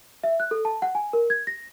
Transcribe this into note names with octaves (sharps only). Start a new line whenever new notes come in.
E5
F#6
A4
A5
F#5
G#5
A#4
G#6
A#6